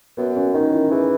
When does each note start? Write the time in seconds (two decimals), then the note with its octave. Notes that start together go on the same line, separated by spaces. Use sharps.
0.17 F#2 B3
0.36 C#4
0.54 D#3 D#4
0.73 E4
0.91 E3 G#4